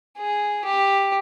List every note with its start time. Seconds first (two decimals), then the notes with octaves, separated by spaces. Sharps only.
0.18 G#4
0.65 G4